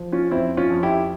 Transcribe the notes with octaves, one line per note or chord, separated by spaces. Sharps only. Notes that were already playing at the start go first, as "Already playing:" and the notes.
Already playing: F3
C#4 F4
F2 C4 E4
C#4 F4
F2
E4 G4